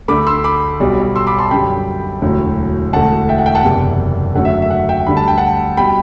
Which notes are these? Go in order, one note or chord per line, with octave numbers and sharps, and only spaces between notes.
D2 D3 A3 B5 D6
C6 E6
B5 D6
B1 B2 G3
C6 E6
B5 D6
A5 C6
F#2 D3 G3 G5 B5
E1 D2 D3 F#3
E1 D2 D3 A3 F#5 A5
E5 G5
F#5
E5 G5
F#5 A5
F#1 E2 C3
F#2 D3 F#3 A3 F#5
E5
E5
F#5
E5 G5
D2 D3 G3 B5
A5
G5
F#5 A5
B2 G3 G5 B5